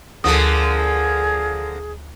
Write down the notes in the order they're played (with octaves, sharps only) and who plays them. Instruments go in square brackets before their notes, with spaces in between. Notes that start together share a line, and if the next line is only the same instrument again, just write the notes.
[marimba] D2 D#6 [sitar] D3 F3 A#3 [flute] G#4